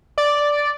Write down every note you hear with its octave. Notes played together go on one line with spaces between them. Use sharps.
D5